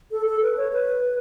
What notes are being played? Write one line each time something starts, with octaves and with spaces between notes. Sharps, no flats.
A4
A4
B4
C#5
B4